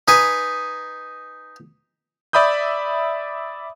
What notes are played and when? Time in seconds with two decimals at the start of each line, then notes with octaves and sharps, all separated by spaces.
0.08 D#4 B4 G#5
2.33 D5 E5 B5 D#6 G6